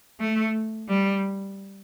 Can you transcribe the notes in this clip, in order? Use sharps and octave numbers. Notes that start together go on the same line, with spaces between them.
A3
G3